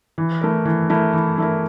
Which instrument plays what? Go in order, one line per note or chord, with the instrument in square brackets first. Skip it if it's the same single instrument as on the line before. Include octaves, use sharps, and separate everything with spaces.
[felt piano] E3
A3 E4 A#4
E3
A3 E4 A#4
E3
A3 E4 A#4